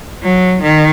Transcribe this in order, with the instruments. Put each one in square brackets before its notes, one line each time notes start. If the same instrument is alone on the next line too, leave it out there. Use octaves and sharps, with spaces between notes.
[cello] F#3
D#3